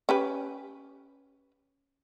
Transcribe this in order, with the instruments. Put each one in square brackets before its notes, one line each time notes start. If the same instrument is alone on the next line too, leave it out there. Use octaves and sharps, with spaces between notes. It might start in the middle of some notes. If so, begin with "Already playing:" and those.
[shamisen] C#4 G4 B4